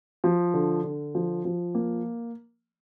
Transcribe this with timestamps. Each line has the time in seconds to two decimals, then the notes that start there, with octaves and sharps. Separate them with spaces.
0.24 F3
0.54 D3
0.84 D3
1.15 F3
1.45 F3
1.75 A#3